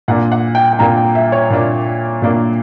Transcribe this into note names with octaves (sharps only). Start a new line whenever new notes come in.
A#2 A#3 D4 F#5
F#5
G5
G5
A#2 A#3 D4 A#5
G5
E5
C#5
A#2 A#3 D4
A#2 A#3 D4